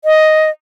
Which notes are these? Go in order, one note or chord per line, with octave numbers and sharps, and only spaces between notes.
D#5